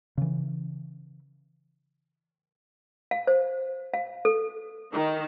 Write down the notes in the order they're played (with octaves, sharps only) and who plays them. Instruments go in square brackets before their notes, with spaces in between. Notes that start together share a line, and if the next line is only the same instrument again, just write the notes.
[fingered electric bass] C#3 E3
[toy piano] F5
C5
F5
A4
[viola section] D#3